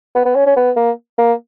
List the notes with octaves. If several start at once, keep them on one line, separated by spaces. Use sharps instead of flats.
B3
B3
C#4
C#4
B3
A#3
A#3